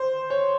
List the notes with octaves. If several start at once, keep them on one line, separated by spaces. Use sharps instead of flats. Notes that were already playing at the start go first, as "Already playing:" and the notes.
Already playing: C5
C#5